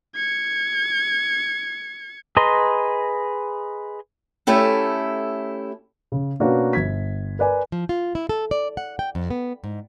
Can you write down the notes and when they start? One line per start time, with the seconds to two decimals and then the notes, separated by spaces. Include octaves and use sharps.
0.16 G#6 C#7
2.37 G#4 B4 D#5 A#5 C6
4.47 A3 C#4 E4 G4 A4
6.12 C#3
6.40 B2 A#3 C#4 D4 F#4 B4
6.73 G1 G#6 B6
7.39 A#4 B4 D5 G#5
7.72 F3
7.89 F4
8.15 E4
8.29 A4
8.51 D5
8.77 F#5
8.99 G5
9.15 F2
9.30 B3
9.64 G#2